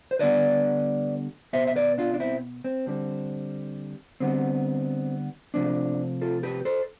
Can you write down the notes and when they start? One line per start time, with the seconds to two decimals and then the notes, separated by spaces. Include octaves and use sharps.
0.11 C5
0.19 D3 G3 B3 B4 D5
1.53 B2 B3 C5 E5
1.67 E5
1.76 B4 D5
1.98 D4 F4
2.14 D4
2.20 C4 E4
2.64 C4
2.87 D3 G3 C4
4.20 D3 G3 B3 C4
5.54 C3 F3 A3 C4 D4
6.21 F4 A4
6.43 G4 B4
6.65 A4 C5